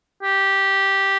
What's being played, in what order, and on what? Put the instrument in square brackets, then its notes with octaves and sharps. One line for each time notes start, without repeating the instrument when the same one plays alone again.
[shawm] G4